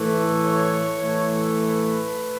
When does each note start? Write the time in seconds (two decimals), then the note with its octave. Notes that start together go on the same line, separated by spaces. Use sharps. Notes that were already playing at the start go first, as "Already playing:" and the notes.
Already playing: A2 E3 A3
0.41 C#5
1.00 A2 E3 A3
1.59 B4